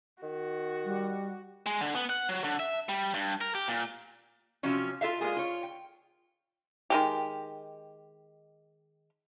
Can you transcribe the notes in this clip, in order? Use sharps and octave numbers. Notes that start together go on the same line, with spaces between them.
D#3 F#4
G3
G#3
D3
B3
F#5
F#3
D3
E5
G3
G2
A#4
G4
A#2
C3 F3 F#3 C#4
F4 A4 E5 F5
G3 G#3 A#3 F4 G#4
F4 C#5
G5
D#3 G#3 G4